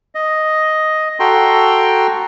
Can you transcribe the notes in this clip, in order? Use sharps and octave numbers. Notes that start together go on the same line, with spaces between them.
D#5
F#4 A4 G5 A#5 C6